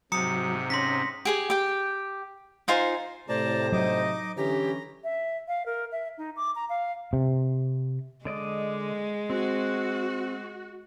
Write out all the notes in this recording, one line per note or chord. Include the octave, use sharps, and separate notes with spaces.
G#2 C3 F#3 A#5 D#6 C#7
C#4 C6 A#6 B6
G4 G#4 G#5
G4 G5
D#4 F4 C5 G#5
A2 C3 C5 D5 A5 A#5
F#3 D#4 D#5 D6
D3 E3 C#4 G4 A#5
E5
F5
A#4
E5
D#4
D6
A#5
F5
C3
D3 G#3 D5 D#5
C4 F#4